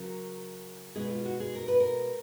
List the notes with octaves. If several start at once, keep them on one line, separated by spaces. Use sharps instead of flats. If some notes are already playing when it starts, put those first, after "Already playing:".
Already playing: C#3 F#3 A#4
B2 G#3 G#4
F4
F#4
G#4
A#4
B4
A#4